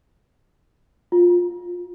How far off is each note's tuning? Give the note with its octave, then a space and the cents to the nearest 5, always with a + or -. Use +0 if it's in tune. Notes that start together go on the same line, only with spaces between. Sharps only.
F4 +15